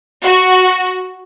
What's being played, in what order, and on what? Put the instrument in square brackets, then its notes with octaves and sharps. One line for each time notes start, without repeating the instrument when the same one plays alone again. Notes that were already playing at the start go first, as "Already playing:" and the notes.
[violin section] F#4